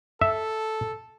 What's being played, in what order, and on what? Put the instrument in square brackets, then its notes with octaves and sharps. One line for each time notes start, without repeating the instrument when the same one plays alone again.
[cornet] A4 [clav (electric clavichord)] E5